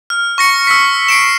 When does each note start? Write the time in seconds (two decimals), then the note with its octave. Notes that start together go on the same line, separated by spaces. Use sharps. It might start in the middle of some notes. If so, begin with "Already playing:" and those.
0.10 F6
0.38 C#6 A#6 C#7
0.67 E6 B6
1.09 C7 D7 E7